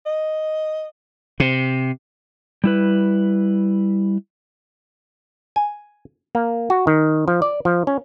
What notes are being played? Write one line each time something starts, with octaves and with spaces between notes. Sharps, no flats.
D#5
C3
G3 E4 B4
G#5
A#3
F#4
D#3
F3
D5
F3
C#4